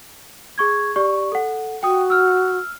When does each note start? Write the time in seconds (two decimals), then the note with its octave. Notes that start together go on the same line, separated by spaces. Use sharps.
0.58 G#4 C#6 G#6
0.96 G4 D5 C#6
1.32 A4 F#5
1.83 F#4 G5 D#6
2.10 E6 F6